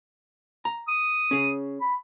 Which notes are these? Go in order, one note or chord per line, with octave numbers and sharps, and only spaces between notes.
A#5
D#6
C#4 G#4
B5